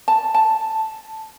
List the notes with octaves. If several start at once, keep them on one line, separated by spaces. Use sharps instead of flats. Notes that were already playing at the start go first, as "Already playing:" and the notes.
A5
A5